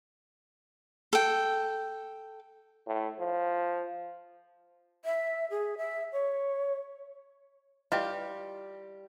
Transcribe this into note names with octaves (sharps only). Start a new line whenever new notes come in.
A4 G5
A2
F3
E5
G#4
E5
C#5
G3 E4 F4 G4 B4 D#5